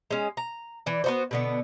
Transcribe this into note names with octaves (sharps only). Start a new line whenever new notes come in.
G#3 C#4
A#5
E3 D5
B3 F#4 C5
B2 D3 B3